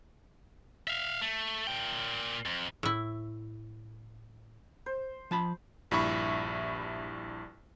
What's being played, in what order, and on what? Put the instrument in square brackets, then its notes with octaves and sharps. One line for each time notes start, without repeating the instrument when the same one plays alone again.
[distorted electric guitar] E5 F5
A3
A#2 G5
F2
[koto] A2 E4
[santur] C5
[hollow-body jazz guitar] F3 A5 B5
[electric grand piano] A#1 G2 E4 E5 B5 C#6